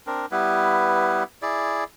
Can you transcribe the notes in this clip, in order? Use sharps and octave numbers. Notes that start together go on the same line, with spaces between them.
C4 D4 A#4
G3 B3 E4 B4
E4 G#4 D5